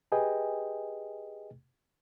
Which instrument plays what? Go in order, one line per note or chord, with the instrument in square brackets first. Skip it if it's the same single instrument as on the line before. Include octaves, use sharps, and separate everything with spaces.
[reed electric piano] G4 G#4 B4 D#5 G5 G#5